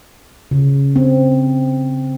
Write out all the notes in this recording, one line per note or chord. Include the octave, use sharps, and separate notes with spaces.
C#3
C4